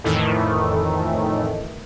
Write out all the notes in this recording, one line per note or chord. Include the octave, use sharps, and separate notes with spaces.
F2 A2 D#3 E3 A3